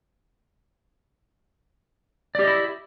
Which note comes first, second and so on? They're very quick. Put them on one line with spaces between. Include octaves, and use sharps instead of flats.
D5 G4 D#5 E4